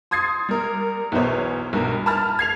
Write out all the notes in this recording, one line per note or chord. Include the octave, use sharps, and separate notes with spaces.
C6 D#6 G#6 A6 C7
G3 A#4
B1 E2 B3 C5 C#5
B1 G2 A#4
A5 B5 F6 A6
G#6 C7 F7